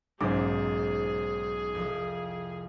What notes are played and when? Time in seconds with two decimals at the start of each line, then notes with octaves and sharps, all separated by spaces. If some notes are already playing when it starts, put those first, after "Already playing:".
0.21 B1 G#2 C#3 D#4 G#4 C5 D6
1.75 C2 F2